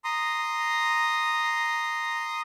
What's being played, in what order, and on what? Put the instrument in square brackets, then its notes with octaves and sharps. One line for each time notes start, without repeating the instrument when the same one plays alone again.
[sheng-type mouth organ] A#5 C6 D#6